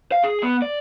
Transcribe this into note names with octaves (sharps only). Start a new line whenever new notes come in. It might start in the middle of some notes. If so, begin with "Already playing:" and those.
F5
G#4
B3
D5